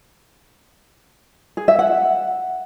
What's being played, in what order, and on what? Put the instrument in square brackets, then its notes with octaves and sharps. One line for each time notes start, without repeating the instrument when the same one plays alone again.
[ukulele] G#4
E5
F#5